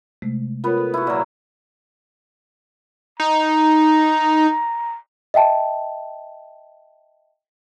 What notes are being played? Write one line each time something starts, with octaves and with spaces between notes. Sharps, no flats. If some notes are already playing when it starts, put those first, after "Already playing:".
C3 G#3 A3
B3 F4 A#4 B4 C#5
A4
E4 F#4
A#2 F#3
D#4 A#5
D#5 E5 G5 A5